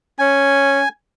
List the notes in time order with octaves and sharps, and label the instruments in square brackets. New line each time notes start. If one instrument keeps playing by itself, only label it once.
[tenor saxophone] C#4 [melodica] G#5